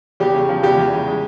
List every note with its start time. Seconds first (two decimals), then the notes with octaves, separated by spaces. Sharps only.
0.20 E2 G3 G4
0.34 C#3
0.49 F3
0.63 E2 G3 G4
0.78 E2
0.93 C#3
1.07 G#3